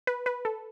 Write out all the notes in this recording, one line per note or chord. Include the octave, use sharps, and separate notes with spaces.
B4
B4
A4